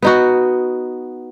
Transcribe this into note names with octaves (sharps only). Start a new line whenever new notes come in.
B3 D#4 F#4